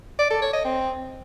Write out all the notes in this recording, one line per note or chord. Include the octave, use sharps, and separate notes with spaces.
D5
A4
C#5
D#5
C4